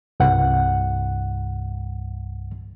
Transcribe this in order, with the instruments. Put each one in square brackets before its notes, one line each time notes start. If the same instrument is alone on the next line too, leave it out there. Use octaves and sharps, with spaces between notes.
[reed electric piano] C2 G2 F#5